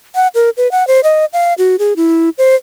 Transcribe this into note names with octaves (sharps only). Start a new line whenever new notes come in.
F#5
A#4
B4
F#5
C5
D#5
F5
F#4
G#4
E4
C5